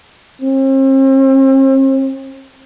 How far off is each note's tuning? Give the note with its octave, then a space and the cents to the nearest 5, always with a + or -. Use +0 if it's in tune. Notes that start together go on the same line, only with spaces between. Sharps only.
C4 +40